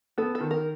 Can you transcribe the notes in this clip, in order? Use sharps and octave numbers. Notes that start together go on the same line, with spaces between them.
B3 A4
A4
D#3
A#4